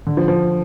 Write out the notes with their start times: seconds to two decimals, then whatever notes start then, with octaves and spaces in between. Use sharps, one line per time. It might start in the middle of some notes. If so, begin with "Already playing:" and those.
0.07 D3
0.17 F3
0.28 F3